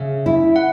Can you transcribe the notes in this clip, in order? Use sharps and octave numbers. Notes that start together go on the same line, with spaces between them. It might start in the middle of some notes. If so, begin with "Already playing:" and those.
Already playing: C#3 E5
E4
F#5